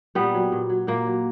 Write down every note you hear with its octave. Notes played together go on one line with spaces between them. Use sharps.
A#2 G3 B3
F#3
A#2
F#3
A#2 A#3
F#3